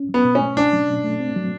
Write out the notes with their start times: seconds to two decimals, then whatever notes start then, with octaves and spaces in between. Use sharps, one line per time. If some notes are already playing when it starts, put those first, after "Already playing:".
Already playing: C#4
0.09 F#3
0.14 B3
0.25 B2
0.35 C#4
0.41 A3
0.57 C#4 D4
0.73 F#3
0.88 B2
1.04 A3
1.20 C4
1.36 F#3